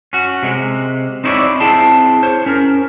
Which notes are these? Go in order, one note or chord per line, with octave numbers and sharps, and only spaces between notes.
C#4 F#4
C3 G#3
C4 D#4 E4 C#5 D5
C4 E4 G#4 C5 A5 C6
C5 C#5
C#4 A#4